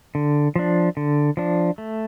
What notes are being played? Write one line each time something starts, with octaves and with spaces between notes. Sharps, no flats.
D3
F3 D4
D3
F3 D4
A3